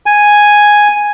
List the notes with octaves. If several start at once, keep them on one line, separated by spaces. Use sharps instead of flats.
G#5